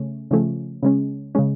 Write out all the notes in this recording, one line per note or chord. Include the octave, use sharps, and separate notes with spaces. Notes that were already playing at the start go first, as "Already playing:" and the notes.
Already playing: C#3 A3 C#4
C#3 F3 A3 C#4
C#3 G#3 C#4
C#3 G#3 C#4